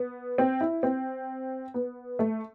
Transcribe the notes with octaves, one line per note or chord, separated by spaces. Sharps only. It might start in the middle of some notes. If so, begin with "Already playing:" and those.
Already playing: B3
C4
E4
C4
B3
A3